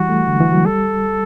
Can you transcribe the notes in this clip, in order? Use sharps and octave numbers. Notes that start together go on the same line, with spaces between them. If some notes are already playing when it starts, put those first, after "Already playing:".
Already playing: E3 G3 F#4
A3
D3
E3
F#3
G3 A4